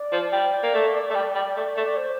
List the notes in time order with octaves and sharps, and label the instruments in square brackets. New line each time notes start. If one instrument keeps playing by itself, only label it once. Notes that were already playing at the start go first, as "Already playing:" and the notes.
Already playing: [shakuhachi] D5
[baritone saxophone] F3
G3
A#3
A3
A3
G3
G3
A3
A3
[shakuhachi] D5
C5